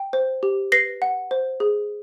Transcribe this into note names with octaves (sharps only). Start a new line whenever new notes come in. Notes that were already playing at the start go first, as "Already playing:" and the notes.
Already playing: G5
C5
G4
B4 A#6 C7
F#5
C5
G#4